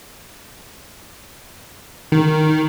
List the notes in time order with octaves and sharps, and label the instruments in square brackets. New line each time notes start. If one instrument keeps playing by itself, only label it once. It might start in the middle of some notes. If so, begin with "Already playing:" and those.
[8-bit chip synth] D#3